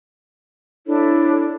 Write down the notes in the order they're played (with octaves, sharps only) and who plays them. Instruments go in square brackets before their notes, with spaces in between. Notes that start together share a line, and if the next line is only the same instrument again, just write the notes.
[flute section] D4 E4 A4 C#5